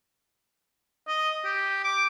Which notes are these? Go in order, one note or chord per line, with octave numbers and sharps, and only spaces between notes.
D#5
G4
D6